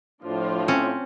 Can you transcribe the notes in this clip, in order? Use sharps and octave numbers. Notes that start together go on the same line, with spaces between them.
A2 F3 D4 F4
C4 C#4